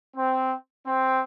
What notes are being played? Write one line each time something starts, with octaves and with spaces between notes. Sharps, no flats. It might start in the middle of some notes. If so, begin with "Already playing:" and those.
C4
C4